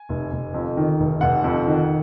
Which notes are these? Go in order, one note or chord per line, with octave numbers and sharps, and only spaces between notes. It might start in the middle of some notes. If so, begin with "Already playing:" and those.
Already playing: G#5
F1
F1
F2
D#3
F1
F1 F#5
F2
D#3